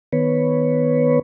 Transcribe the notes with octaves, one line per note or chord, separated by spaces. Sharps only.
D#3 B3 B4 C#5